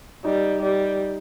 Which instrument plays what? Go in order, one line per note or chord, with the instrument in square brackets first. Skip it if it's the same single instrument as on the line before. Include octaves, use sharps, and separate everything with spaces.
[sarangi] G3 [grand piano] D#4
[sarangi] G3